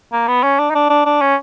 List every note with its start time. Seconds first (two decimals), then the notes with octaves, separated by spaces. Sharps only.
0.13 A#3
0.28 B3
0.43 C#4
0.59 D4
0.70 D#4
0.75 D4
0.90 D4
1.06 D4
1.21 C#4